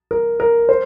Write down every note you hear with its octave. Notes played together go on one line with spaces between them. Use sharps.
A#4
A#4
C5